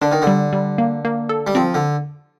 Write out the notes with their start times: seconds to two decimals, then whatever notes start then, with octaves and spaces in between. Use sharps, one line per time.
0.02 D3 D4
0.12 D#3
0.22 D3
0.27 G3
0.53 G3
0.78 A#3
1.05 A#3
1.29 A4
1.47 G3
1.55 F3 C4
1.74 D3